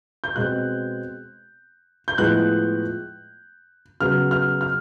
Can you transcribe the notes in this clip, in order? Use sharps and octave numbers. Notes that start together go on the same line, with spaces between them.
G6
B2 G#3 C4 F#6
G6
A2 F3 G#3 B3 F#6
C#3 F#3 B3 F6
F6
F6